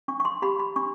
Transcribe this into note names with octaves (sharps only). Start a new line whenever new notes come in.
D4 C#6
C#6
C6
G4 B5
B5
D4 C#6